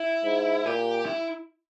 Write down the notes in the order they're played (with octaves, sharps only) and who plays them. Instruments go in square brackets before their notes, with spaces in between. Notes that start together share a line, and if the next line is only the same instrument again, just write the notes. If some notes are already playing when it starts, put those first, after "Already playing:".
Already playing: [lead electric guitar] E4
[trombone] G#2
[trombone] A#2 [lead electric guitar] G4
[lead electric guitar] E4